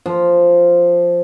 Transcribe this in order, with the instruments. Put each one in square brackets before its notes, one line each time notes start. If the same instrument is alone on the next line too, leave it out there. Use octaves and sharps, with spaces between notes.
[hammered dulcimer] F3